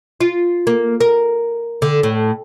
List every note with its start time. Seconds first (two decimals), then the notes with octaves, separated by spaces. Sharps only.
0.20 F4
0.67 A#3
1.00 A#4
1.82 D3
2.03 A2